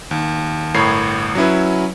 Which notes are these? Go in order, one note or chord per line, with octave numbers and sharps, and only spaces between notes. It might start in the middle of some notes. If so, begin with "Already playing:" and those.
D#2
G1 A2 A#4 C#5 B5 C7
F#3 C#4 E4 B4